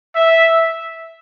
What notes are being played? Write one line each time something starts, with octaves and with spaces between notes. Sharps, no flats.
E5